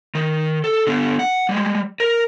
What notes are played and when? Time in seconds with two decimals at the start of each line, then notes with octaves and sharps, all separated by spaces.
0.15 D#3
0.64 A4
0.87 D3 B3
1.19 F#5
1.49 G3 G#3
2.00 A#4